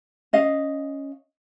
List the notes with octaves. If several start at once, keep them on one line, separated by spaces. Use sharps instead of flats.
C#4 D#5 F5